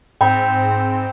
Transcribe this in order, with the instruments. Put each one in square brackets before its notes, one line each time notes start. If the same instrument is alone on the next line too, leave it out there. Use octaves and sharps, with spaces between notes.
[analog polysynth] G#2 C4 [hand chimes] G5 B5